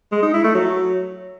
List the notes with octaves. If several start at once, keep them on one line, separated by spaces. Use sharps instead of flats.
G#3
D#4
E4
A3
F#3